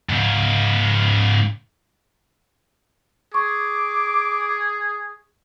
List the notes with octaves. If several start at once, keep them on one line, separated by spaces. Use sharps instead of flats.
G#2 C#3
G#4 C#6 D6